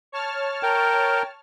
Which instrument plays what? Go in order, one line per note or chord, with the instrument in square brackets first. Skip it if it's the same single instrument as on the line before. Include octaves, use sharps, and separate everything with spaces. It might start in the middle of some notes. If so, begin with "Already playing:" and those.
[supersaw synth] C#5 A5 F6
[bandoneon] A#4 G5